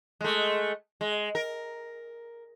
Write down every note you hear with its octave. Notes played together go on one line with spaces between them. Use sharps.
G#3 A3
G#3
A#4